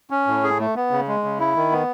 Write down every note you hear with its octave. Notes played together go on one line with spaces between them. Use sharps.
C#4
A2
G#4
A3
B3
C#3
G#3
C#3
E4
D#3
B3